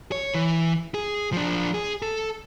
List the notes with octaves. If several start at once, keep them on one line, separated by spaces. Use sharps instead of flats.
C#5
E3
G#4
F3 D4
G#4
A4